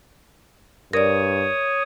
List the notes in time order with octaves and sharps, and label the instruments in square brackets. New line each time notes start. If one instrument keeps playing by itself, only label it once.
[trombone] G2 [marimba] A#4 D5 [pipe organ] C#5 D#6